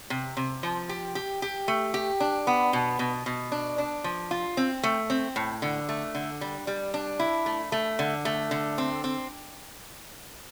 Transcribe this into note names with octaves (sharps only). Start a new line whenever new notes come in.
C3
C3
F3
G4
G4
G4
A3
G4
D4
B3
B2
B2
B2
D4
D4
F3
F4
C4
A3
C4
A2
D3
A3
D3
G3
G3
D4
E4
A3
A3
D3
A3
D3
C4
C4